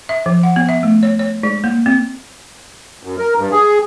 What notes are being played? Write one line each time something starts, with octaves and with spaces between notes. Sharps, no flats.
E5
F3
F#5
B3
E5
A3
C#5
C#5
G#3
A#3
C4
F#2
A#4
G2
G#4